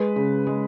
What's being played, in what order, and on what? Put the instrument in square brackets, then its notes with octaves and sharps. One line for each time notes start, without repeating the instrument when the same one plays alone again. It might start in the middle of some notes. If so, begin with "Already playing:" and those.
Already playing: [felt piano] G#3 B4
C#3
G#3